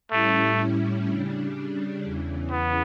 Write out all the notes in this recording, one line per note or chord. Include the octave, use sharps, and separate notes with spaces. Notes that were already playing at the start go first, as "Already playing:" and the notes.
A2 G3 A3 C#4 E4
C#3 G3 D4
E2 C#3 E3
B3